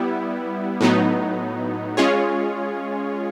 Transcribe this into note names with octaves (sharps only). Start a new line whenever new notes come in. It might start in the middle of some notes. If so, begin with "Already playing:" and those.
Already playing: G3 B3 E4
A2 F#3 B3 D#4
G#3 C#4 F4 G#4 C#5